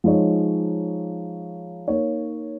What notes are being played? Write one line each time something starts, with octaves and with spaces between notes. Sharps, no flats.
F3 G#3 D#4 C#5
A#3 D#4 C#5